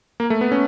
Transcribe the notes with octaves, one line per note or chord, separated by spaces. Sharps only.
A#3
A3
B3
C#4